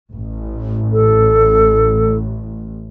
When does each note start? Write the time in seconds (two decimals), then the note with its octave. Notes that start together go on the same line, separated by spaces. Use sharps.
0.11 A1
0.93 A4